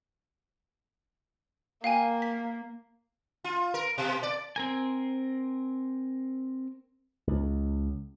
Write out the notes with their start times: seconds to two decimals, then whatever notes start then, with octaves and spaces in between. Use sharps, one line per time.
1.84 A#3 F5 G5 G#5
2.22 B6
3.44 F4
3.74 A#4
3.98 B2
4.23 D5
4.56 C4 A#4 G#5
7.27 C#2